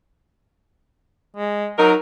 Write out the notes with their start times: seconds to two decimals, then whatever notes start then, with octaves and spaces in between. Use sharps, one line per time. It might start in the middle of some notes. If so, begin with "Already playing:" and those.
1.37 G#3
1.78 F#3 D#4 A#4